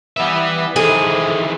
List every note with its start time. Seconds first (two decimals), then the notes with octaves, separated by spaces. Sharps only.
0.17 E3 G3 B3 E5
0.76 C3 D#3 E3 G#4 A4